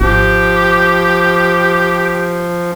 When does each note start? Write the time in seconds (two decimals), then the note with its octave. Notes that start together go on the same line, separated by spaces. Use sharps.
0.01 G#1 F3 G4